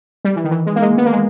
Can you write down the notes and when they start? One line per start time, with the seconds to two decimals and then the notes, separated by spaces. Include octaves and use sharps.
0.25 G3
0.36 E3
0.44 D#3
0.51 E3
0.66 G#3
0.76 A#3
0.82 G#3
0.98 B3
1.06 A#3
1.12 G#3